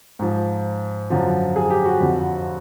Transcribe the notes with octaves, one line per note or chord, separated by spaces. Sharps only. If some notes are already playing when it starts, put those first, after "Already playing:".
G#2 F3
F#2 D3 F3
G#4
G4
F#4
F2 D3 F3